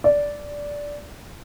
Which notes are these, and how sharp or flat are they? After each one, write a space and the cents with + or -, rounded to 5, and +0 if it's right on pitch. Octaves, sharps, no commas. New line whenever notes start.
D5 -10